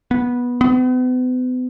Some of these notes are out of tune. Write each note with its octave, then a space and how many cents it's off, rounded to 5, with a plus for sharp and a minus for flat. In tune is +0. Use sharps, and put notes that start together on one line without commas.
B3 -15
B3 +40